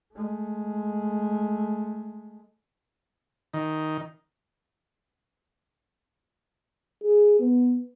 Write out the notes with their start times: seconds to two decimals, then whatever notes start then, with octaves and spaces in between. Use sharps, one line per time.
0.14 G#3 A3
3.54 D#3
7.03 G#4
7.40 B3